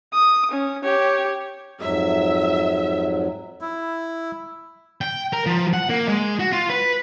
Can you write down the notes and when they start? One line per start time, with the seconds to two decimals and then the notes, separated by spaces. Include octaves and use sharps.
0.13 D#6
0.51 C#4
0.83 G4 C#5
1.81 F2 G#2 F#3 E5
3.61 E4
5.01 G5
5.33 A#4
5.46 F3
5.73 F#5
5.89 A#3
6.08 G#3
6.40 F#4
6.53 F4
6.70 B4